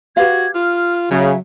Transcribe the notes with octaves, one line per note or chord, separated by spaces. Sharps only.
F#4 G4 B4 F5 G#6
F4 F6
C#3 F#3 E5